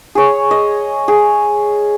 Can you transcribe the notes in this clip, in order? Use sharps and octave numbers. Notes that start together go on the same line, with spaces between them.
G#4 C#5
D#5
G#4